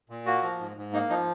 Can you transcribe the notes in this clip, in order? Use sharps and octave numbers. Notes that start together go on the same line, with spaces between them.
A#2
A#3 F#4
F3
G#2
G#2
A#3 D#4
F3 D#4